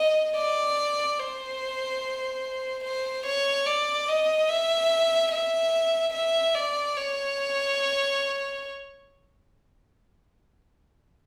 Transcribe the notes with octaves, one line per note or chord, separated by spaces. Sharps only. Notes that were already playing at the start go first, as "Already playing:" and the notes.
Already playing: D#5
D5
C5
C5
C#5
D5
D#5
E5
E5
E5
D5
C#5